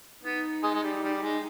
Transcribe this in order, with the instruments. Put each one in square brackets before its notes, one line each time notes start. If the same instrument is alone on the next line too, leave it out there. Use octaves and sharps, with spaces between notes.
[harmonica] B3 [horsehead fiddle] D#4
[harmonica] G#3
G#3
G3
G3
G#3